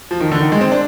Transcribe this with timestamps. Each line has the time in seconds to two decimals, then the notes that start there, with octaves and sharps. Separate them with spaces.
0.11 F3
0.20 D#3
0.31 D3
0.41 D#3
0.52 G#3
0.61 C4
0.72 D4